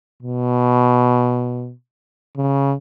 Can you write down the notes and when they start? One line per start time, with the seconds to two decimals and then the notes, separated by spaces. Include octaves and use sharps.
0.23 B2
2.37 C#3